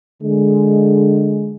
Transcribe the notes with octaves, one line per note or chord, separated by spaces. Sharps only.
D3 G#3